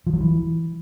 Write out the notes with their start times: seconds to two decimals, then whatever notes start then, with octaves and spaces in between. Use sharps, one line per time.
0.07 F3
0.13 F#3
0.20 E3